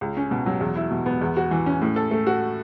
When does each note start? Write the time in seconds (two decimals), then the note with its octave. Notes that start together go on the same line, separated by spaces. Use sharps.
0.01 C#2
0.17 C#4
0.31 B2
0.46 F#3
0.61 E2
0.76 E4
0.91 B2
1.06 B3
1.21 E2
1.37 F#4
1.51 E3
1.66 C#4
1.82 A2
1.96 A4
2.11 A3
2.27 F#4